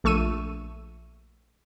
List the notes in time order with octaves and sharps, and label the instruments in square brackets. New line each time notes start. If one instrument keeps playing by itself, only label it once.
[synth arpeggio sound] A#1 A3 C#6 E6 D#7